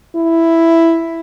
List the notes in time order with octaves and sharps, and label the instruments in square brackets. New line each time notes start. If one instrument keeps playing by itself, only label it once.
[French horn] E4